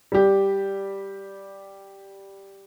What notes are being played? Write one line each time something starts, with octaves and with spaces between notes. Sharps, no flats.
G3 G4